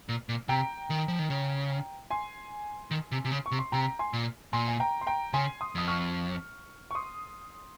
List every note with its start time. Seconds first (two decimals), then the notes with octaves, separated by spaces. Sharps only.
0.09 A#2
0.29 A#2
0.48 C3 G5 A#5
0.90 D#3
1.08 F3
1.19 D#3
1.30 C#3
2.10 G#5 C6
2.91 D#3
3.12 C3
3.25 C3
3.31 C#3
3.46 C#6
3.51 C3
3.59 C6
3.72 C3 G5 A#5
3.99 G#5 C6
4.13 A#2
4.53 A#2 G#5 C6
4.68 G#5
4.80 G5 A#5
5.01 C6
5.07 G5 A#5
5.33 C#3 G#5 C6
5.61 C6 D#6
5.75 F2 D#6
5.88 C#6 F6
6.91 C#6
6.95 C6 D#6